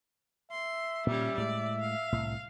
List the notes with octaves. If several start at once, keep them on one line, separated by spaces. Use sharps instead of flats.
E5 C6
A#2 G3 C#4
A2 G#3 D5
F5
C2 A2